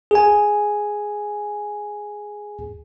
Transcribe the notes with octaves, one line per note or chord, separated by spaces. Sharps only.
G#4 G#5